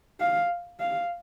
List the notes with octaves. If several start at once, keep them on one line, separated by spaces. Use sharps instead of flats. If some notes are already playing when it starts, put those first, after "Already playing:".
F5
F5